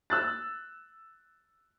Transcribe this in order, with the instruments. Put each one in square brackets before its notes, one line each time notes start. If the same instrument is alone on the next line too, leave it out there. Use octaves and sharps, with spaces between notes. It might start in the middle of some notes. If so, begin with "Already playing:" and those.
[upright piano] E6 F#6 A6